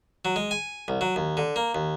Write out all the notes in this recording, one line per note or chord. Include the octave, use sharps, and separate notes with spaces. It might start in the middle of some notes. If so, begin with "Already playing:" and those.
F#3
G#3
G#5
C2
F#3
D#2
D3
A#3
D#2